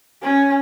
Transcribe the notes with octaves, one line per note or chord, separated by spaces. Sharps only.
C#4